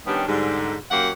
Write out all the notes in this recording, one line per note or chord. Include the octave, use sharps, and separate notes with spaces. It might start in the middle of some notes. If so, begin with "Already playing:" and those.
D#3 G3 B3 C#4 D4 G4
G#2 D3 G3
F#2 F#3 A#3 G4 F#5